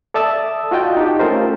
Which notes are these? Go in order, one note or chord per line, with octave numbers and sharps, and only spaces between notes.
A4 D5 E5 A5 D#6 E6
F4 F#4 D#5 G5 A5
D#4 G4
A3 C#4 F4 A4 A#4 C5